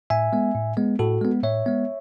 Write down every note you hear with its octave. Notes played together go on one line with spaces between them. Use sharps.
A2 E5 G#5
G#3 B3
A2
G#3 B3
A2 F#4 A4
G#3 B3
A2 C#5 E5
G#3 B3